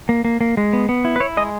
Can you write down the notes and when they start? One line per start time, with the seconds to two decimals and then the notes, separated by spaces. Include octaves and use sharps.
0.09 A#3
0.25 A#3
0.41 A#3
0.57 G#3
0.73 B3
0.89 B3
1.05 E4
1.16 B4
1.20 E4 C#5
1.37 G#3 D#5